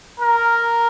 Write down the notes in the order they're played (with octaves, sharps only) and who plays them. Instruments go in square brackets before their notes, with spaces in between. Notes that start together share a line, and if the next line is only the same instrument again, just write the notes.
[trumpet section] A#4